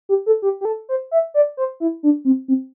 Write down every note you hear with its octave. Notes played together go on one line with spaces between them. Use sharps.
G4
A4
G4
G4
A4
C5
E5
D5
C5
E4
D4
C4
C4